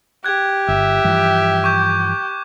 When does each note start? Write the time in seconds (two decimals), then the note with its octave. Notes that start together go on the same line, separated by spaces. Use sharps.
0.24 G4 F#6 G#6
0.68 G1 E5
1.04 G2 E3 F3
1.64 C#6 D6 G6